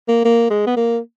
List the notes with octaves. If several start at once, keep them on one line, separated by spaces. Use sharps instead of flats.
A#3
A#3
G#3
B3
A#3